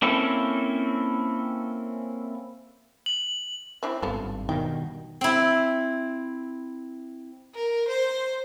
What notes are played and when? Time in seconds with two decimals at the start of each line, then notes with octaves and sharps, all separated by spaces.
0.02 A#3 C4 C#4 E4 A4
3.06 F#7
3.83 C4 D4 E4
4.02 G#1 G2 B3 F4 A4
4.49 G2 B2 D#3 G5
5.21 C4 E4
7.54 A#4
7.88 C5